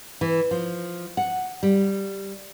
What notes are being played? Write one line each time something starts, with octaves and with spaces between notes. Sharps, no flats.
E3
F3
F#5
G3